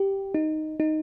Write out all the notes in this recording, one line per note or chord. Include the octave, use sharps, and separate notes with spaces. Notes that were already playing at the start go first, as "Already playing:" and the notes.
Already playing: G4
D#4
D#4